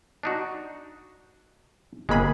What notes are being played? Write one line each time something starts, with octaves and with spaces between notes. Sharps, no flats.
D4 D#4 F#4
G1 G#3 A#3 C4 G#4 B5